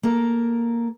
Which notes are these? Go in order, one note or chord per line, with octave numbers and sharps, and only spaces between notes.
A#3 A4 A#4